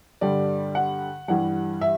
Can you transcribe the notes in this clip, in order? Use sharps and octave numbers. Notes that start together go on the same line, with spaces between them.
G2 D3 G3 D5
F#5
G2 E3 G3 F#5
E5